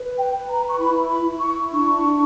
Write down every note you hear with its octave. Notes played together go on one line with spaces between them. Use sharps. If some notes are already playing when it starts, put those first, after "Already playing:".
Already playing: B4
G5
B4
A#5
C#6
E4 B5
B5
E4
C#6
D4 C#6